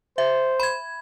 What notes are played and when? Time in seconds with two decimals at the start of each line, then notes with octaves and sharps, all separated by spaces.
0.18 C5 E5
0.60 B5 G#6